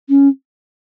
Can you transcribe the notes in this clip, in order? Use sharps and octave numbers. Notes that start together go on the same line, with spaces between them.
C#4